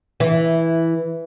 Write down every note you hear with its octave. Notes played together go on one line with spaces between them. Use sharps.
E3